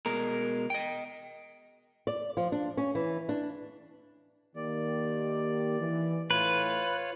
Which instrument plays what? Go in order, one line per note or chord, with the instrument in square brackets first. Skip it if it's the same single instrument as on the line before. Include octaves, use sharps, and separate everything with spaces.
[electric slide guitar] B2 G#3 A#4
D#5 G5
[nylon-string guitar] D5
F3
D4
C#4
E3
D4
[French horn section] D#3 A#3 G4 [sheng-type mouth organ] D5
[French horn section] E3
[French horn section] A2 E3 [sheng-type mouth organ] F4 C#5 [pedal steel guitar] B4